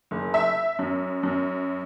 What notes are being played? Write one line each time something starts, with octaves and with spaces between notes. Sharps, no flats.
F#1
E5
F#2
F#2